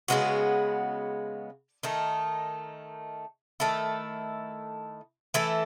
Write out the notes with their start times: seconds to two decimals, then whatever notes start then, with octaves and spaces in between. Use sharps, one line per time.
0.08 C#3 G#3 B3 F#4
1.83 D#3 A3 D#4
3.60 D#3 A3 E4 A4
5.34 E3 A3 E4 A4